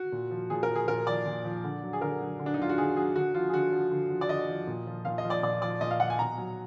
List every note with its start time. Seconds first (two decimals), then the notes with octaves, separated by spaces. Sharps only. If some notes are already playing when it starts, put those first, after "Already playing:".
Already playing: F#4
0.12 A#2
0.31 F3
0.50 A#2 G#4
0.63 A#4
0.68 F3
0.75 G#4
0.88 A#2 A#4
1.07 F3 D5
1.26 A#2
1.45 F3
1.64 D3
1.83 F#3
1.93 G#4
2.02 D3 A#4
2.21 F#3
2.39 D3
2.46 D4
2.54 D#4
2.59 F#3 F4
2.69 F#4
2.78 D3 G#4
2.97 F#3 G#4
3.15 D3 F#4
3.34 F3 F4
3.49 G#4
3.54 D3 F#4
3.72 F3
3.91 D3
4.10 F3
4.21 D5
4.29 D3 D#5
4.49 F3
4.67 A#2
4.87 F3
5.05 A#2 F5
5.18 D#5
5.24 F3
5.30 D5
5.43 A#2 D5
5.62 F3 D5
5.81 A#2 D#5
5.91 F5
6.00 F3 F#5
6.10 G#5
6.19 B2 A#5
6.38 F#3